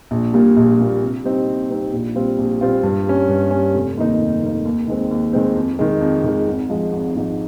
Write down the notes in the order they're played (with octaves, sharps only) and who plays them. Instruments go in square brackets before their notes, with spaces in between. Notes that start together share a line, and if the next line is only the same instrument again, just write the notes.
[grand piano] A#1
A#2 G3 A#3
A#1
A#2 G3 A#3
C3
G3 C4 D#4
C3
G3 C4 D#4
A#1
A#2 G3 C4 F4
A#1
A#2 G3 C4 F4
G2
G3 C#4
G2
G3 C#4
F1
D#2 D#3 A#3 D#4
F1
D#2 D#3 A#3 D#4
D#2
D#3 G#3 C4
D#2
D#3 G#3 C4
F2
D#3 G#3
F2
D#3 G#3
G#1
G#2 F3 G#3 D#4
G#1
G#2 F3 G#3 D#4